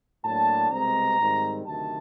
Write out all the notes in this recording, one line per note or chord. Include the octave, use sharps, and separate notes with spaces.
A2 F#3 A#3 D4 A5
C2 B2 G#3 C4 A#5
G#2 D#3 G3 C4
D2 C3 D#3 F#3 A5